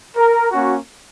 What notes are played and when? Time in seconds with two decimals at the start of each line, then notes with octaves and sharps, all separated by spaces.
0.16 A#4
0.51 A#3 C#4 F#4